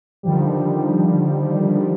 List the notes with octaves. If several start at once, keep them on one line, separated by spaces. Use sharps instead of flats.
D3 D#3 F3 G3